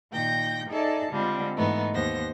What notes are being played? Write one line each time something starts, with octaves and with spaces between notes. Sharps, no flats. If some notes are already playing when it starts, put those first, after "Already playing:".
A#2 D#3 G5 G6 A#6
D#4 G#4 A4 D5 E5 A5
D3 G3 G#3 C4 F4
G#2 E3 A3 B3 D#4
D#2 B3 C5 A#6